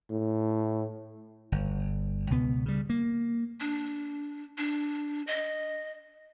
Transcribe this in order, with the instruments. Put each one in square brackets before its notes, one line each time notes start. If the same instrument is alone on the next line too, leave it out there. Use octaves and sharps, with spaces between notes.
[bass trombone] A2
[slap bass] G1
C#2 B2 B3
C#3 G3
A#3
[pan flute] D4
D4
D#5